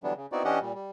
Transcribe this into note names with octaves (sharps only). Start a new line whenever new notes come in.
D3 E3 F#3 G3 B3 D4
C#3
B3 C4 D#4 E4 F#4 D5
E3 C#4 D4 G4 D#5 F#5
A#2 G3
G3